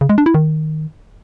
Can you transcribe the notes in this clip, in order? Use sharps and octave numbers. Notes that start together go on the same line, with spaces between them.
C#3
G#3
D4
E4
D#3